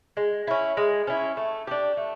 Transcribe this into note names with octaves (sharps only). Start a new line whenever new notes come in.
G#3
C#4 E4
G#3
C#4 E4
A3
D4 G4
A3